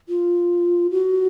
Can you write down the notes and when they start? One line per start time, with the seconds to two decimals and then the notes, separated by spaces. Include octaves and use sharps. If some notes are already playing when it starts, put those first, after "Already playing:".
0.09 F4
0.91 F#4